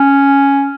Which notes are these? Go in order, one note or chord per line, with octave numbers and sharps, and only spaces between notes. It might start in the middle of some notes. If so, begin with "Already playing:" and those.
Already playing: C#4